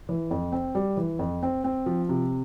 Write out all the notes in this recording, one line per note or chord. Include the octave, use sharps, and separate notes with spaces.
E3
F2
C4
G3
E3
F2
C4
C4
F3
C3